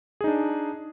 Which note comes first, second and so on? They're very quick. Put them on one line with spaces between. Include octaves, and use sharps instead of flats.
G#4 D#4 D4